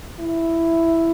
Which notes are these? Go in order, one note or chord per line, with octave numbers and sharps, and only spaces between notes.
E4